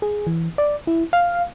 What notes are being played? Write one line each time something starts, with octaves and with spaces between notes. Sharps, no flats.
G#4
E3
D5
E4
F5